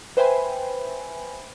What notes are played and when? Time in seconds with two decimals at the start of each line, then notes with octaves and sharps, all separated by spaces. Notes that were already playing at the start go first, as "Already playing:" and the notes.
0.17 B4 C5 E5 G5 G#5 B5